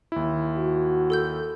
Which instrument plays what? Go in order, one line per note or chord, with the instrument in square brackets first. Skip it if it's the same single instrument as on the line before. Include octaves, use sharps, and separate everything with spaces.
[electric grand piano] D#2 E4
[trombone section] F#4
[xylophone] A4 E6 G6